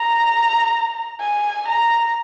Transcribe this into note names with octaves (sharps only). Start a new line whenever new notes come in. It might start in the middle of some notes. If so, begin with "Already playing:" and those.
Already playing: A#5
G#5
A#5